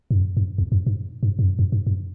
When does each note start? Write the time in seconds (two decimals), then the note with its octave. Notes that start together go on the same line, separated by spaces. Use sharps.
0.11 G2
0.15 F#2
0.37 F#2
0.58 E2
0.72 F#2
0.87 G2
1.23 G2
1.39 G2
1.44 F#2
1.59 F#2
1.72 G2
1.87 F#2